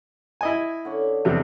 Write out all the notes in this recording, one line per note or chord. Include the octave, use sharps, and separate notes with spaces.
E4 D#5 G#5
D3 C#4
E2 C3 G#3 D4